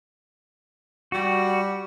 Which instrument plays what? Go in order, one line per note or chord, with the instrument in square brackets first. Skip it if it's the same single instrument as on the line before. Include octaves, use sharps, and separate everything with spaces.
[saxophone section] G3 [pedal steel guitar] F#4